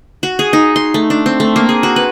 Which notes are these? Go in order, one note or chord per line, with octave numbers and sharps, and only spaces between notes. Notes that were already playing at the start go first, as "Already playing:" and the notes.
F#4
G#4
D#4
C6
A3
D4
C4
A3
A#3
G#4
F#4
B4